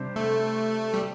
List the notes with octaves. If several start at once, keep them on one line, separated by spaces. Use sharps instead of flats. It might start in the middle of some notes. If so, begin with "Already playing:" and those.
Already playing: C3 G3 D4 G4 C5
A3
G3